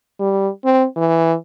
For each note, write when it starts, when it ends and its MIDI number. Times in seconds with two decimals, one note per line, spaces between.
0.20 0.49 55
0.64 0.85 60
0.97 1.34 52